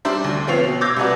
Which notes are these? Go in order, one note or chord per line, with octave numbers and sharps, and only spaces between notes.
G3 D4 C5 E5
D2
F3 B3 C4 C#5 C7 F7
B2
D6 E6 G6 G#6 A#6
C2 F#4 B4 D5